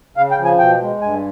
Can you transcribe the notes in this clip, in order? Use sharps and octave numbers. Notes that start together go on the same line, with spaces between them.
C#3 F5
G5
F3
G#5
B2 G5
G#3
G2 G#5